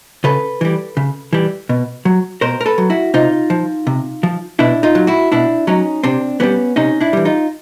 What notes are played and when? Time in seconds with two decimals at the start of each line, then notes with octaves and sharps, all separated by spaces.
0.24 C#3 A4 B4
0.61 E3 G3
0.97 C#3
1.33 E3 G3
1.69 B2
2.05 F#3
2.41 B2 A#4 C5
2.61 A#4
2.66 A4 B4
2.78 F#3
2.90 E4 F#4
3.14 C3 D#4 F4
3.50 F3
3.87 C3
4.23 F3
4.59 B2 D4 E4
4.83 D#4 F4
4.95 F#3
5.07 E4 F#4
5.32 B2 D4 E4
5.67 F#3 C#4 D#4
6.03 C3 C4 D4
6.40 E3 G3 B3 C#4
6.76 C3 C#4 D#4
7.00 D4 E4
7.13 E3 G3
7.25 D#4 F4